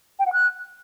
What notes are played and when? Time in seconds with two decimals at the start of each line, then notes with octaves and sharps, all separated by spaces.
0.19 G5
0.26 F#5
0.33 F#6